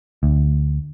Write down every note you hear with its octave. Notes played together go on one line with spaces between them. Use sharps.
D2